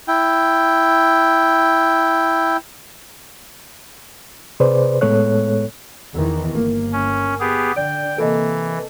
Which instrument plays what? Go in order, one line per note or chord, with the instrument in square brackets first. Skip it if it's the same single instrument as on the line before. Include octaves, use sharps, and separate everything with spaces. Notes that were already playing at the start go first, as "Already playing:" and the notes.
[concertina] E4 G5
[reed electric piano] C3 G#4 B4 C5 D5
A2 G#3 B3 A4 C#5 F#6
[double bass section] E2 D#3 E3
[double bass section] G1 [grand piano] A#3
[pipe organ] C#4
B3 G4 G#4
[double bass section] D3 [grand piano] D5 [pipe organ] G5
[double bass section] C3 A#3 [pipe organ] E3 [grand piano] A4 D#5